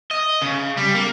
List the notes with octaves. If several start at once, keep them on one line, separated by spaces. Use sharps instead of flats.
D#5
C#3
G3
A#3